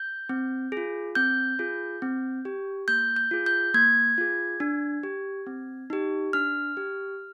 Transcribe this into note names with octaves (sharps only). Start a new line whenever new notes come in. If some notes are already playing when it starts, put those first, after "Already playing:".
Already playing: G6
C4
F4 G#4
C4 G6
F4 G#4
C4
G4
A#3 G6
G6
F4 G#4
G6
A#3 G#6
F4 G#4
D4
G4
C4
D#4 G4
D4 F6
G4